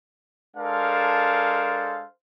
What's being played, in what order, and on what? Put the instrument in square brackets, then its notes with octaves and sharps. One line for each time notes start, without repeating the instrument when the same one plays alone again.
[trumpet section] G#3 D4 A4 A#4 C5 F5